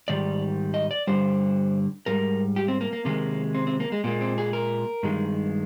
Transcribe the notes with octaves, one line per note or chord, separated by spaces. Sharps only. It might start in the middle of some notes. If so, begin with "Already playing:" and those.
G#2 D#3 G3 D5
D#5
D5
G2 D3 G3 C5
G#2 G3 A#4
G4
C4
A#3
A#3
C3 D#3 G#3 A#3
C4
C4
A#3
G#3
A#2 G#3 A#3
C4
G#4
A#4
G2 D#3 G#3